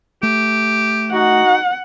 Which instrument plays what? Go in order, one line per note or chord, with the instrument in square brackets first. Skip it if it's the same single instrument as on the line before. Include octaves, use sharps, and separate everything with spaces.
[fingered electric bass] A3 [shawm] G4
[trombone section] D#4 F#4 [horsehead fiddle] F#5